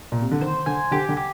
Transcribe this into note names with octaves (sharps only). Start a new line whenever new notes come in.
A#2
C3
D3
D#3 C5
D3 G#5
D3 G4
D3
G4